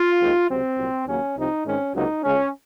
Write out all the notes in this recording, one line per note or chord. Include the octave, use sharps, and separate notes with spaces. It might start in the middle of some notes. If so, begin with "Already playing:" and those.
Already playing: F4
D#2 D#3 G#3 C4
C#2 C3 F#3 C4
C2 A#2 F#3
D#2 C#3 F#3 A#3 C#4
C2 C3 F3 C4 D#4
G#2 D#3 G#3 C4 C#4
C#2 C3 F#3 A#3 D#4
C#2 C#3 G#3 C#4